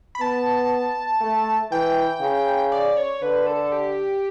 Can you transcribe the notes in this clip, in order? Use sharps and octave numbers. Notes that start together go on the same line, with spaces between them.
B5
B3 A5
A3
E3 G5
C#3
D5
C#5
D3 B4
A4
G4